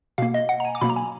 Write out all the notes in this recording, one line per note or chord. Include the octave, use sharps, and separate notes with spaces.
B2 A#3 F5
D#5
F#5
A#5
G#5
D6
B2 F#3 A#3 B5
A#5
G#5